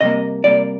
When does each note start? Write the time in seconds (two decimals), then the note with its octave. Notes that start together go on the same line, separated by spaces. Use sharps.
0.01 C3 G3 A#3 D#5
0.44 C3 G3 A#3 D5